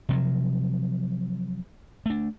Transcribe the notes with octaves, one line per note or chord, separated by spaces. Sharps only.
C3 F3 F#3
A3 D4